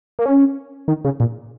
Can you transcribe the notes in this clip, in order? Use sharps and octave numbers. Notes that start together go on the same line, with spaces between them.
A#3
C#4
D#3
C#3
A#2